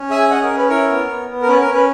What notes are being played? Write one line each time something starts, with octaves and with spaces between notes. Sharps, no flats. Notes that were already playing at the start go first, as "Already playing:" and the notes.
Already playing: C#4
G#4 E5 G#5
G#5
C#4 D#5 F#5
A#4
C#4
B4
E4 A#4 C#5
B3
B3
B3
A#4
C#4 B4
A#4
C#4
B4